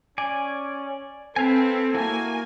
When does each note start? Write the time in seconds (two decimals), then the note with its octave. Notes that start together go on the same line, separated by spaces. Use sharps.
0.18 C#4 D5 G#5
1.36 C4 A4 B4 F5 G#5
1.95 A#3 E4 F#4 A#4 G#5